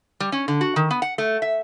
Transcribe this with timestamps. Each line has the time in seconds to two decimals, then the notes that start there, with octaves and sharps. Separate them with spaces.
0.20 G3
0.32 C#4
0.48 D3
0.61 F#4
0.76 D#3
0.91 B3
1.02 F#5
1.18 A3
1.42 E5